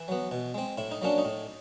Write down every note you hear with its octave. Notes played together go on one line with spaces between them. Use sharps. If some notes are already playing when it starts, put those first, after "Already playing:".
Already playing: E3 E4
F#3 B3
B2
G#3 C4
A2 E4
D#4
F#3 A#3 C#4 D4
D#4
A2